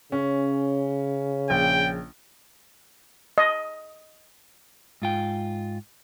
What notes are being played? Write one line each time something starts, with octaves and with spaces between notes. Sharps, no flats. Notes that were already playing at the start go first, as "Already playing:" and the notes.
C#3 C#4
A#1 G5
D#5
G#2 F4 G5